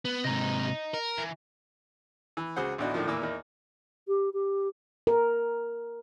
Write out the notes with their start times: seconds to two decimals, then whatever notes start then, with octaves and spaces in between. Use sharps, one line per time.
0.05 B3
0.24 G#2 C3 D#5 A#5
0.94 A#4
1.18 E3
2.37 E3
2.56 C#2 F#4 G#4 C5 F#5
2.78 A1 D2 B3 D4 D#4 F#4
2.94 A2 D3 D#3 F3
3.07 E2 A#2 E3 A#3 D6 E6
3.22 E2 A#3 D#4
4.08 G4
4.34 G4
5.07 A#4